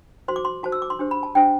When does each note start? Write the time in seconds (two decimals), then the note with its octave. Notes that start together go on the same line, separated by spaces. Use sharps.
0.28 F#4 C5 C6
0.36 D6
0.45 C6
0.63 F#4 C5 A5
0.72 E6
0.82 D6
0.90 C6
0.99 D4 G4 C5
1.11 B5
1.23 A5
1.35 D4 G4 C5 G5